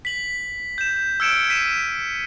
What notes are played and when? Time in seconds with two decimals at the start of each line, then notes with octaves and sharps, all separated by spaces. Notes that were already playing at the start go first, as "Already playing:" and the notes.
0.05 B6 F#7
0.78 G6 E7
1.20 E6 F6 G#6 C#7 D7 E7
1.50 B6 D#7 E7